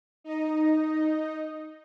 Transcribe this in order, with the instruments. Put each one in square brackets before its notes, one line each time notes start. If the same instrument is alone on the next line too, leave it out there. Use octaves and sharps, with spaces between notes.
[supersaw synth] D#4 D#5